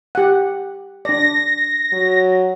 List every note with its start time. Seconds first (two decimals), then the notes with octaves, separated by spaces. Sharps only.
0.15 G4 F#5
1.05 D4 D5 A#6
1.93 F#3